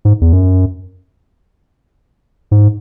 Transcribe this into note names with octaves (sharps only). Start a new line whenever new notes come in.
G#2
E2
F#2
G#2